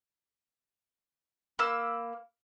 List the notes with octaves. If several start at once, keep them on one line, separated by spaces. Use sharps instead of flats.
A#3 B5 E6